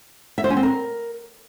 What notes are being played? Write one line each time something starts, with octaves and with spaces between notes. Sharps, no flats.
E5
C5
C#4
C4
A#4